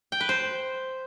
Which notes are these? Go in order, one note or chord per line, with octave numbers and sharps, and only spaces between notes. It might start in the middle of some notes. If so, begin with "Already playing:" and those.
G5
B4
C5